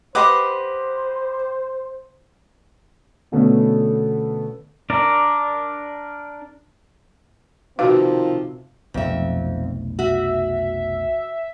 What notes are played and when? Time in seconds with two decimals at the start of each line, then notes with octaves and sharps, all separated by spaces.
0.15 G4 B4 C5 D#5 F#5 C6 D6
3.32 B2 D3 A3 B3 C#4 A4
4.90 D4 A#4 D5
7.79 C3 D#3 F3 C4 F4 F#4 B4 F5
8.94 F1 B1 F2 E5
9.99 F#4 E5